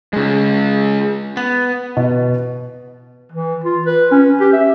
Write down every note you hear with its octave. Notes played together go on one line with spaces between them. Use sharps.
C#3 G#3
B3
B2
E3
F4
B4
C#4
G4
E5